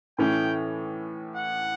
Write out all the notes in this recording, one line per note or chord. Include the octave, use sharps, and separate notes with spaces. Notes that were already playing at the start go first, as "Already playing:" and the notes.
A2 E3 A3 C#4 G5
F#5